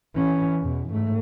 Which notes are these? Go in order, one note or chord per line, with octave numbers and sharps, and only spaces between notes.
E3 C#4
E2 B2
G#2 A3